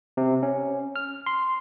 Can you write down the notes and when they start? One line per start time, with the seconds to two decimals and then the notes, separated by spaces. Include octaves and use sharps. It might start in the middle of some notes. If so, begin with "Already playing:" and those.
0.17 C3
0.43 C#4
0.96 F6
1.26 C6